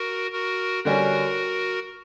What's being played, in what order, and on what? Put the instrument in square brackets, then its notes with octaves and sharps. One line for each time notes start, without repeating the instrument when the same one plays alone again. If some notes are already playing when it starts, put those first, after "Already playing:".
Already playing: [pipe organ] F#4 A#4
F#4 A#4
[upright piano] D3 G3 C#4 [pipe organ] F#4 A#4